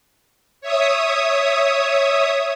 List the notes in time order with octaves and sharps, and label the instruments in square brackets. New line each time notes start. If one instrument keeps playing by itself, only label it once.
[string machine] C#5 E5 D#6